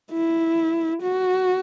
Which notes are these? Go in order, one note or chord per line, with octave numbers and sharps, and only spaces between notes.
E4
F#4